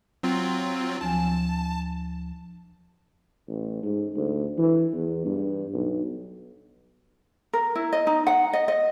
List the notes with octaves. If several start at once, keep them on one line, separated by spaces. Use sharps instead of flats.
F#3 C4 F4
D2 F3 G#5 A5
A1
G#2
D2
E3
E2
G2
B1
A#4
E4
D#5
D#4
F#5
D#5
D#5